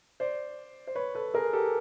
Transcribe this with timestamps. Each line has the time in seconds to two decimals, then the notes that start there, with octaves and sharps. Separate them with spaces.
0.20 C5 D5
0.87 C5
0.95 B4 C#5
1.15 A4 B4
1.34 G#4 A#4
1.53 G4 A4